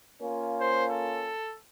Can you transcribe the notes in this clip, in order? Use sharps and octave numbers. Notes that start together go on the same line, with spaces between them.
A#3 C#4 F4
C5
A4